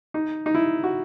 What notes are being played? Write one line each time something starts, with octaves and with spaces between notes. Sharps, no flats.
D#4
D#4
E4
F#4